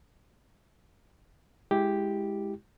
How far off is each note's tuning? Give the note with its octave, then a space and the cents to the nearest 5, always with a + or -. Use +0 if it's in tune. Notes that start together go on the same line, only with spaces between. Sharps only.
G#3 +0 E4 -10 G4 +0